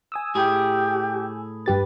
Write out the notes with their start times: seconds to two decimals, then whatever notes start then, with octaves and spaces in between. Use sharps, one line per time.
0.12 G#5 D#6 E6
0.35 A2 G4 G#4
1.66 G2 G4 B4 A6